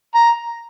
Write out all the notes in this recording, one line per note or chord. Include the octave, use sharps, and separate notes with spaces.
A#5